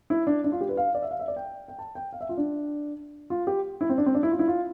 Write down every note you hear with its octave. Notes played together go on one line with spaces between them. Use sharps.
E4
D4
D4
F4
G4
B4
F5
D5
E5
F5
E5
D5
G5
G5
A5
G5
F5
E5
F4
D4
F4
G4
E4
C4
D4
C4
D4
E4
F4
E4
F4